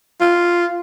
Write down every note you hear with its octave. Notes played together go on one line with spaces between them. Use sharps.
F4